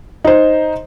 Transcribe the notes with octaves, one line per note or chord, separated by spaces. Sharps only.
D#4 C5